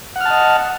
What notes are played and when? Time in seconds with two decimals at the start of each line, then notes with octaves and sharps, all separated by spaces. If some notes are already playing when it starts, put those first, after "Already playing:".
0.16 F#5
0.21 F6
0.25 A5
0.30 D#5